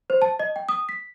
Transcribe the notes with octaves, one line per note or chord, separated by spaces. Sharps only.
C5
A5
D#5
G5
D#6
B6